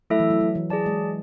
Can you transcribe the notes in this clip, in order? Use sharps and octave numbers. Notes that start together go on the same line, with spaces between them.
F#3 A3 E4 A4 E5
E3
F#3
F#3
E3
F#3 G#4 D5 A5
G#3